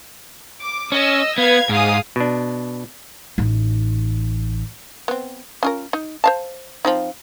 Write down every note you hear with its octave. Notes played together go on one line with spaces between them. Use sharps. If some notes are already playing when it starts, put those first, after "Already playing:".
D6
C#4 D#5 E6
B3 B4 F5 G#6
G#2 G#4 F5 D#6
B2 D4
A1 D#4
B3 C4
C#4 F4 A#4
D#4
C5 F5 A5
F3 C4 D#4